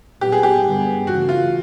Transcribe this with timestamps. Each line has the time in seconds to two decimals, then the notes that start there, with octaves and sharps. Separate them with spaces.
0.21 A#2 F#3 B3 G4
0.32 G#4
0.43 G4
0.64 G2 D3 G3 B3
1.07 C#3 E3 A3 F#4
1.29 F4